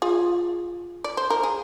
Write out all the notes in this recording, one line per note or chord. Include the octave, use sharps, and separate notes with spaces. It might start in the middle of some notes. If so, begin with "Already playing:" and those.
F4 G#4
D5
C5
A#4
G#4